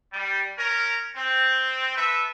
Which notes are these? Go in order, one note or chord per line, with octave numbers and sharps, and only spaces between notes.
G3
C#4 A#4
C4
A4 B4 E5